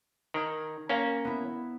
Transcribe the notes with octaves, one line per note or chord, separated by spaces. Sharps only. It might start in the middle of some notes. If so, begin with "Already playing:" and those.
D#3 A#5 F6 G#6
A#3 C#4 A#5
B3 E4